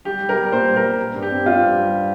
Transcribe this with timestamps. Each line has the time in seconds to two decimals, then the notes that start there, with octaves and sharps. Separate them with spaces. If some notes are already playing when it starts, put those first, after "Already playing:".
0.05 G3 G4
0.20 G3
0.29 A#4
0.36 G3
0.52 A#2 C5
0.68 G3
0.76 A#4
0.84 G3
0.98 G3
1.15 G2
1.22 G4
1.31 C4
1.45 C4 F4
1.61 G2
1.77 G3